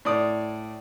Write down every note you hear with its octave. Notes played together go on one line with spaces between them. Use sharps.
A2 D5 D#6